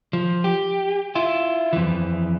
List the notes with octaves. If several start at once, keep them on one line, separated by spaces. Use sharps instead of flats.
F3
G4
E4 F4
F2 E3